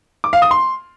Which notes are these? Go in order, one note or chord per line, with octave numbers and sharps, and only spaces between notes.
D6
F5
D#6
C6